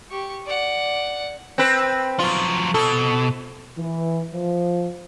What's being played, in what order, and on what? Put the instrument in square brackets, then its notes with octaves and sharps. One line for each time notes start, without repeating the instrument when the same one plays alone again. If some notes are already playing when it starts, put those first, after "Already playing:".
[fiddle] G4 C#6
D5 F#5
[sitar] C4 B4
[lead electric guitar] F3 F#3 [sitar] F4
[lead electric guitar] B2 [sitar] A4
[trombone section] E3
F3